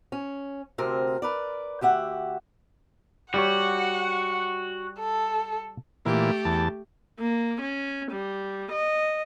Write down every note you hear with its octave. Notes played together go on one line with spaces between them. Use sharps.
C#4
D2 C3 C4 A#4
A#4 B4 D5
D2 G4 E5 F#5
G3 F#4 G4 C#5 F#5
A4
A#2 E3 A3 G4
E2 A5
A#3
C#4
G3
D#5